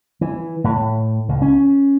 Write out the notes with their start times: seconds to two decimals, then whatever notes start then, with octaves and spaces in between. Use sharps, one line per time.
0.21 E3
0.64 A2
1.29 C#2
1.42 C#4